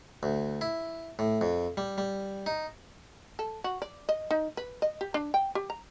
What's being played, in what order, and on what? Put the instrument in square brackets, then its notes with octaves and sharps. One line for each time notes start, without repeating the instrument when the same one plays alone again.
[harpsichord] D2
E4
A2
F2
G3
G3
D#4
[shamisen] A4
F#4
D5
D#5
D#4
B4
D#5
G4
D4
G5
G4
A#5